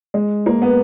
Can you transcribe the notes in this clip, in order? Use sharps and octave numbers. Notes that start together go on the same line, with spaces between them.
G#3
A#3
B3